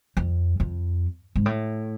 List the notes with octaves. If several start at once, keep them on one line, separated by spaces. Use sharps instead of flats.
F2
F2
G#2
A2